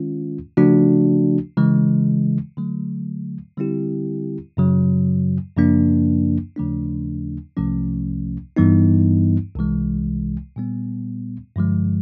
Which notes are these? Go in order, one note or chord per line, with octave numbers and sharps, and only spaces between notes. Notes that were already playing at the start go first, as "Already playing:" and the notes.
Already playing: D#3 G#3 C#4 F4
C#3 F3 A3 D4 F#4
C#3 E3 G#3
D3 F#3 A3
D3 G3 C4 E4 G4
F#2 C#3 F#3
F#2 C#3 F3 A#3 D4
D#2 C#3 F3 A3 D4
C2 C3 F3 A3 C#4
G2 E3 G3 B3 D#4
C2 C3 E3 G#3
A#2 G3 B3
G2 D3 F3 G#3